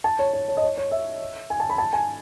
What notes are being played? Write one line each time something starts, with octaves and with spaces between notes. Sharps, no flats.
A5
C#5
C#5
C#5
D#5
C#5
C#5
E5
G#5
A5
B5
A5
G#5